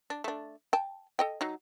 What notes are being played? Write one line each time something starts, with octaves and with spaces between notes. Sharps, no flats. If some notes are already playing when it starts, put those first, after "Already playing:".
D4
A3 D4
G5 A5
A4 D#5 G5
F#3 D#4